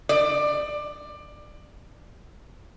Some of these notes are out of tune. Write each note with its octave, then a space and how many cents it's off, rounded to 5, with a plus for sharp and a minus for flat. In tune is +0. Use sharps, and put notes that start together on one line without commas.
D5 +20